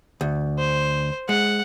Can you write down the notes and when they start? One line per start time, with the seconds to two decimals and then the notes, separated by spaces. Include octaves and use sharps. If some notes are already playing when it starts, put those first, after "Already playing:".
0.21 D2
0.59 C5
1.29 G#3 F#5